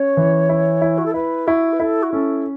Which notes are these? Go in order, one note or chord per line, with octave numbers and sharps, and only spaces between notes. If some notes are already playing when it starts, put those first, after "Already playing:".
Already playing: C#4 C#5
E3
E4
E4
F#4
A4
E4 B4
E4 F#4
B4
E4 A4
F#4
C#4 A4